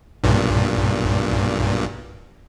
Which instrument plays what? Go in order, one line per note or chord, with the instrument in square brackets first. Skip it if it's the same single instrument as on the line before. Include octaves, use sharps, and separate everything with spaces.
[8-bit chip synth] B1 G2 A#2